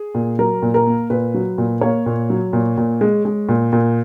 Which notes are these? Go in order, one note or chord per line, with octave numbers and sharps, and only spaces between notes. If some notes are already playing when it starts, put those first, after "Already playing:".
Already playing: G#4
A#2
F#3 A#4
A#2
A#4
A#3
A#2 B4
F#3
A#2
A#3 C#5
A#2
F#3
A#2
A#2
G#3
G#3
A#2
A#2